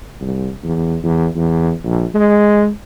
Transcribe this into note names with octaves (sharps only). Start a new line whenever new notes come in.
C2
E2
E2
E2
A#1
G#3